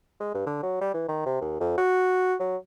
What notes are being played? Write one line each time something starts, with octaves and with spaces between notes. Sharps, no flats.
G#3
G2
D3
F#3
G3
E3
D#3
C3
D#2
F2
F#4
F#3